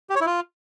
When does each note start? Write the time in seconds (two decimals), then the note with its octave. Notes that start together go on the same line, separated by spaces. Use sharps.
0.10 G4
0.15 C#5
0.21 E4
0.26 F4